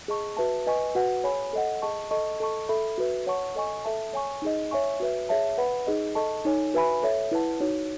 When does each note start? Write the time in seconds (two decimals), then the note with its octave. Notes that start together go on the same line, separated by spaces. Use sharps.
0.08 G#4 D#5 A5 C#6
0.37 F#4 B4 E5 A5
0.66 B4 D#5 G#5 C#6
0.95 F#4 B4 F#5
1.24 G#4 C#5 G#5 B5
1.53 A4 D#5 F#5
1.82 G#4 D#5 A5 C#6
2.11 A4 D#5 A5 C#6
2.40 A4 D#5 A5 C#6
2.69 A4 E5 B5
2.98 F#4 B4 E5
3.27 C#5 F#5 A5 C#6
3.55 A4 D#5 G#5 C#6
3.84 A4 E5 A5
4.13 C#5 G#5 C#6
4.42 D#4 G#4 D#5
4.71 C#5 E5 G#5 C#6
5.00 F#4 B4 E5
5.29 G#4 C#5 E5 A5
5.58 B4 F#5 B5
5.87 D#4 G#4 D#5
6.15 A4 D#5 A5 C#6
6.45 D#4 A4 C#5 G#5
6.74 F#4 B4 E5 G#5 B5
7.03 A4 C#5 E5
7.31 E4 B4 F#5 A5
7.60 D#4 F#4 C#5